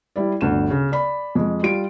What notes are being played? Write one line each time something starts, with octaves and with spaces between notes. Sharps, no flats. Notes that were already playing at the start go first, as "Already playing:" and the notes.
G3 E4 D5
G1 D2 E7
C#3
D5 B5
F2 G#3
G3 F4 D7